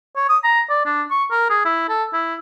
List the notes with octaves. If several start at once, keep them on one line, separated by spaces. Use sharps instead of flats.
C#5
D#6
A#5
D5
D4
C#6
A#4
G#4
E4
A4
E4